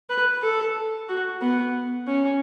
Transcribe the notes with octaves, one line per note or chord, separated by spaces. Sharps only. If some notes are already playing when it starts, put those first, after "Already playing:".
B4
A4
F#4
B3
C#4